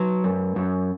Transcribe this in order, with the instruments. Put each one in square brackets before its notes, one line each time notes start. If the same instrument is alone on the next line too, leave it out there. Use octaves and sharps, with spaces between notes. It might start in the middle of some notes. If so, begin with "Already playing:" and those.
Already playing: [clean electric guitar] F#3 B4
F#2
F#2